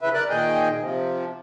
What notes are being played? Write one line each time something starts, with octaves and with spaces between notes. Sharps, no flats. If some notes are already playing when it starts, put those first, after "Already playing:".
C#3 E3 B4 E5
A#4 D5 F#6
A#2 D#3 G#4 D#5 G5
C3 F3